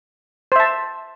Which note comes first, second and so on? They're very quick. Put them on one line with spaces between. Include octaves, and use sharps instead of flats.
C5 E5 A5